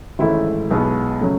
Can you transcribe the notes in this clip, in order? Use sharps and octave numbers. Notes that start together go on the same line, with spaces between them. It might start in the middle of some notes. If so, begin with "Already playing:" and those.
G#1 G#2 E3 A3 C#4 E4
B1 B2 G#3 B3
C#3 F#3 A3